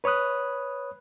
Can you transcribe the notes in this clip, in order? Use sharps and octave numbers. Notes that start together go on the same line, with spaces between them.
B4 C#5 B5 D#6 F#6